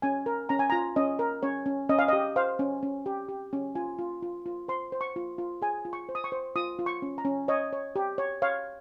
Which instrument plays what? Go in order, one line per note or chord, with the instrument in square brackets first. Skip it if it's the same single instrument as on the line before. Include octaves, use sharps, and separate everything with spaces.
[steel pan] C#4 G#5
A#4
C#4 A#5
G#5
F4 A#5
C#4 D#5
A#4
C#4 C#5
C#4
C#4 D#5
F5
G4 D#5
C5 F5
C#4
C#4
G4
G4
C#4
F4 G#5
F4
F4
F4
C5 C6
C5
C#6
F4
F4
G#4 G#5
F4
C#6
C5
D#6
C#6
C5
F4 D#6
F4
C#6
C#4
A#5
C#4
C#5 D#5
C#5
G4
C#5
C#5 F5